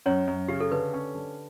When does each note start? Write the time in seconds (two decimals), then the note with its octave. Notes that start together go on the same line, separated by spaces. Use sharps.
0.06 F#2 C#4 C#5
0.28 F#2
0.48 C#3 G4
0.60 A4
0.71 D3 B4
0.94 C#4
1.15 D3